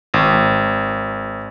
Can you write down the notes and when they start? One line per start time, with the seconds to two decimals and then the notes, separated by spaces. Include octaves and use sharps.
0.14 G#1